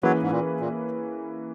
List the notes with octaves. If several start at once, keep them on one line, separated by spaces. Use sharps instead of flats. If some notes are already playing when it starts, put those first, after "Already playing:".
E3 F#3 A#3 C#4 G#4 B4
G#2
A#2
A#2